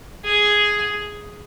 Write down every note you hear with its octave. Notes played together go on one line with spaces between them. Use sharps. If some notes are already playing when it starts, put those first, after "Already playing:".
G#4